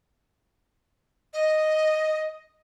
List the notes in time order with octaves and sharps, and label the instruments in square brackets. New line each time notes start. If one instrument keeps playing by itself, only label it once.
[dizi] D#5